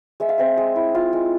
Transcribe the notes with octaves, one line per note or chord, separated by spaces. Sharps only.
G#3 E5
F5
C4 E5
G#3
E4
F4
G#3